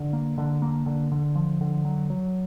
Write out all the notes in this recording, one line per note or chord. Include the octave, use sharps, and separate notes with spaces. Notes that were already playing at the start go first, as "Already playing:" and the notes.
Already playing: D3
A#3
D3
A#3
D3
D3
F3
D3
F#3
F#3